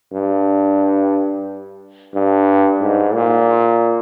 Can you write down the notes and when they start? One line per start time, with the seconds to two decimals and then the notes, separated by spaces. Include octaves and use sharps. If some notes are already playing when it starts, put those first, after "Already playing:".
0.13 G2
2.15 G2
2.81 G#2
3.15 A#2